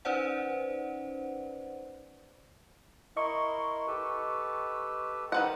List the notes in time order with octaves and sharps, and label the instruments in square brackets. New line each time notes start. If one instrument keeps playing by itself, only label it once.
[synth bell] C#4 D#4 B4 C5 D5 F#5
[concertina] E4 A#4 C6 [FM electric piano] D#5 C#6
[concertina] G4 A4 B4
[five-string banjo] D#3 B4 F#5 [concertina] E4 C5 B5